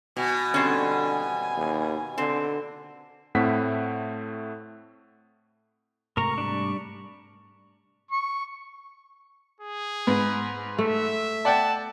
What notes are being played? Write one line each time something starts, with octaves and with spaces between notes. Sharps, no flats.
B2 G#5
D3 G3 C4 C#4
D#2
D3 C4
A2 A3 C4 E4 F#5 B6
G#2 C3 A3 A#4 A#5 C#6
G3 D4
C#6
G#4
G#2 B4
A3 E5
D5 F#5 G5 A5